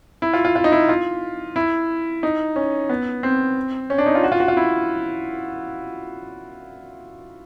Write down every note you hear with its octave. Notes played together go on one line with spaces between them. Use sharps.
E4
F4
F4
F4
D#4
E4
F4
E4
D#4
C#4
B3
C4
C#4
D4
D#4
F4
F#4
F4
F#4
F4
E4